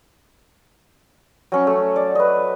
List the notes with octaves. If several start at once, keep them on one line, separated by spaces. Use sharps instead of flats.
F#3 C#4 C#6
A3
D5
B4 D#5